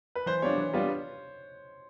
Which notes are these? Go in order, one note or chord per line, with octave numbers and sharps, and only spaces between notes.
B4
E3 C5
G3 B3 D4 F4 C#5
E3
G3 B3 D4 F4